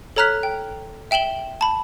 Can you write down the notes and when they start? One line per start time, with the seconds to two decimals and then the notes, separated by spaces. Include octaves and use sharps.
0.16 A4 C#5 A#5 F6 F#6 B6
0.43 G5
1.11 E5 G5 E7 F#7 G7
1.61 A5 B5